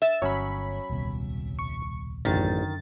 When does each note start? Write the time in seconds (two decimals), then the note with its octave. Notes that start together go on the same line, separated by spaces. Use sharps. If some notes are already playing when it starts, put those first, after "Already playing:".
0.02 E5 A6 E7
0.22 G1 F#3 C#4 C#5 B5
0.90 D#1 C2 B2
1.59 C#6
2.25 A1 F#2 D3 D#3 A6